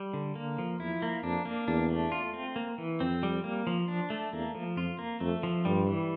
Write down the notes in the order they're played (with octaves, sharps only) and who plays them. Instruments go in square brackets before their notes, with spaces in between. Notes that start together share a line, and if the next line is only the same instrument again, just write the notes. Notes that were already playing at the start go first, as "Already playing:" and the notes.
Already playing: [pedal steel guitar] G3
D3
A#3
F3
[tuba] E2 [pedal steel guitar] E4
[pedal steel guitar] A#3
[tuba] F2 [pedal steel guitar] D4
[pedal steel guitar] A#3
[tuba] E2 [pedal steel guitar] D4
[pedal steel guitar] A3
F4
C4
A#3
E3
[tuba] F2 [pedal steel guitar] C4
[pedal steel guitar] G3
A#3
F3
D4
A3
[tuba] E2 [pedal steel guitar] A#3
[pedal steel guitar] F3
[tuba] F2 [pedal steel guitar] F4
[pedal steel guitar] A#3
[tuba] F2 [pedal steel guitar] A3
[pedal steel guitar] F3
[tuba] G2 [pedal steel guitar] G3
[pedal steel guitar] E3